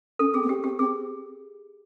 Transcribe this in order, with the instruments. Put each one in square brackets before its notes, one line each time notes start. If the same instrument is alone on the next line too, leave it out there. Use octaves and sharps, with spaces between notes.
[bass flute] C#4 [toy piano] A4
[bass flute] C4 [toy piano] G#4
[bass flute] B3
[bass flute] C4 [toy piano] G4
[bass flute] C4 [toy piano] G4
[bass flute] C4 [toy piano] G#4